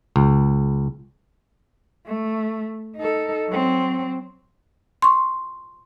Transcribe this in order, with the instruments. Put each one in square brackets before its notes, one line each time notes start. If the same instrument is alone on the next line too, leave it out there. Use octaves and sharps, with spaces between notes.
[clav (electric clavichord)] C#2
[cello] A3
D#4 A4
F#3 C4
[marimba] C6 C#6